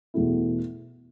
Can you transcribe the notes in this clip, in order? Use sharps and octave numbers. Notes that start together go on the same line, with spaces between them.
E2 B2 A3 E4